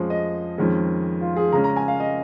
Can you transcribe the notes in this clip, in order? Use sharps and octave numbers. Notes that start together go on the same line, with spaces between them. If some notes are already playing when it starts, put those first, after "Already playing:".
Already playing: F2 F3 G#3 C#4
D#5
F2 D#3 G#3 C#4
F4
G#4
C#3 G#3 C#4 A#5
A#5
G#5
F5
D#5